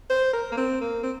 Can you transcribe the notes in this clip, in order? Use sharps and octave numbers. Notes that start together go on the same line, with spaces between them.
C5
A#4
A#3
C4
A#3
C4